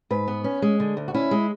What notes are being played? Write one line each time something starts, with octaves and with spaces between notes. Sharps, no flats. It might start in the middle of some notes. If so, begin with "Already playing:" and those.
G#2 B4
B3
C#4
G#3
D3
D2
F#4
C#4 E4
G#3